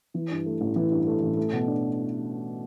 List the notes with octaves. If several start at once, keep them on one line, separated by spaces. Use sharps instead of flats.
E3
G2
A3
A1
E3
G2
A3
A1
A3
B2
D4